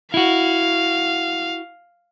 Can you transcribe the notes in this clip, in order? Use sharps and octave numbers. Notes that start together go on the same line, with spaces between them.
E4 F#4 F5